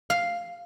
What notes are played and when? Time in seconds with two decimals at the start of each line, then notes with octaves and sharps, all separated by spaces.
0.10 F5